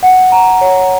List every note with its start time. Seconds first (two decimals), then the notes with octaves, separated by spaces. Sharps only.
0.03 F#5
0.32 A#5
0.61 C#5